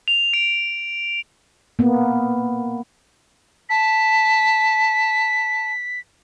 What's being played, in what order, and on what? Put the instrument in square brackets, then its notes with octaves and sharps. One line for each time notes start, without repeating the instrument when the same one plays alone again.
[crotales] F7
D7
[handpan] A#3 B3
[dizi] A5 [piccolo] B6